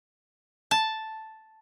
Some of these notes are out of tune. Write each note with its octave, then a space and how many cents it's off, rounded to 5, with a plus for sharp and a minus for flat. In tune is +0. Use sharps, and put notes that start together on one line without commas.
A5 +0